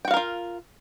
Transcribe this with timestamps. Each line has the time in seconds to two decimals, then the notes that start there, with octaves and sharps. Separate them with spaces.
0.05 G5
0.08 F#4
0.11 F5
0.14 A#4
0.17 F4